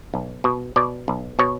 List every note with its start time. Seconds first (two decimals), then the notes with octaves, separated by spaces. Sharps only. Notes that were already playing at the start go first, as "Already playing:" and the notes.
0.14 B1
0.44 B2
0.76 B2 D5
1.08 B1
1.39 B2 C#5